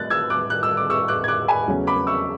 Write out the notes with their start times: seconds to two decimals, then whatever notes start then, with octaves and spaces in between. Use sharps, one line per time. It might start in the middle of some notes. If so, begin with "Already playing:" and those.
Already playing: A2 A3 F#6 A6
0.10 E6 G#6
0.30 D6 F#6
0.50 F#6
0.63 E6
0.77 D6
0.90 C#6 E6
1.08 D6 F#6
1.24 G#6
1.28 D6 F#6
1.48 G#5 B5
1.68 E2 C#3 F#3 A3 C#4
1.87 B5 D6
2.07 C#6 E6